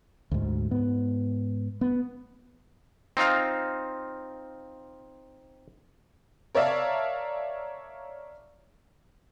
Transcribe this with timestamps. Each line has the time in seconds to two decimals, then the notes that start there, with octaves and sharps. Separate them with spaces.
0.31 D2 G#2
0.71 G#2 B3
1.81 B3
3.17 C4 D#4 F4 F5
6.55 A#4 C#5 D5 E5 F5 A5